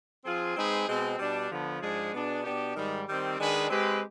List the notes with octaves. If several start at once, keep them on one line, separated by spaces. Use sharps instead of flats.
F3 C4 F4 G#4
G#3 C4 D#4 G#4 B4
B2 G#3 C4
B2 G3 D4
D3 F3 B3
G#2 F3 G#3 D4 G#4
B2 B3 D4 G#4
B2 B3 D4 G4
G#2 D#3 G3
D#3 G3 C4
D#3 G#3 D4 G#4 B4
G#3 C4 G4 B4